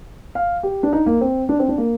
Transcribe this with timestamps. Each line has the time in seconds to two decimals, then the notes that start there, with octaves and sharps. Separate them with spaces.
0.35 F5
0.63 G4
0.83 D4
0.93 D#4
1.06 A#3
1.21 C4
1.49 D4
1.59 C4
1.68 D4
1.78 A#3